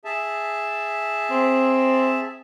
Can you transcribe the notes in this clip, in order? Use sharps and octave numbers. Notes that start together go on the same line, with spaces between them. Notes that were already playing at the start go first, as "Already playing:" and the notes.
G#4 E5 A5
C4